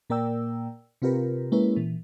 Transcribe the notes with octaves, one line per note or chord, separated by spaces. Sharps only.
A#2 A#3 A#4 D5 G5 E6
C3 C4 F4 G4 A#4 B4
G#3 A#3 C#4 E4 B4
A#2 E3